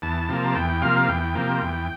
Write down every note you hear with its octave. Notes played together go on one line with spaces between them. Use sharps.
E2 A5
C3 F3 A#3
E2 G5
C3 F3 A#3 F5
E2 G5
C3 F3 A#3
E2